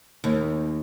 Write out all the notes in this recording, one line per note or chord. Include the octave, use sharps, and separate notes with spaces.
D#2